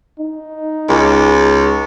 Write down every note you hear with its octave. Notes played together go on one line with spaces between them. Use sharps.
D#4
C#2